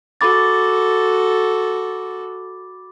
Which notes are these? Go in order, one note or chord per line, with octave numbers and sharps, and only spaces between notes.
F#4 A4 B5 D6 A6